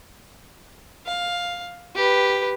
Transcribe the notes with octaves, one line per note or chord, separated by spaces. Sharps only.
F5
G4 B4